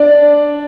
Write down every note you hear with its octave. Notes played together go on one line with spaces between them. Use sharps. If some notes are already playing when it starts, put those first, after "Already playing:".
Already playing: D4 D5